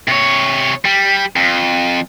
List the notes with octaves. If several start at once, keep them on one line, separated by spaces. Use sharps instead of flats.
C3 C#5
G3
F2